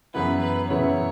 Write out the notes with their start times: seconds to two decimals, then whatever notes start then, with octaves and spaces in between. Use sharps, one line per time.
0.14 F#2 C#3 E3 B3 E4 B4
0.41 B4
0.70 F#2 C#3 E3 B3 E4 C#5